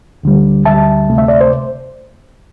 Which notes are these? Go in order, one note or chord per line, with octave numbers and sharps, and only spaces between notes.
D2 D3 G3
D2 D3 G3 E5 A5
D2 C3 A3
E5
D5
C5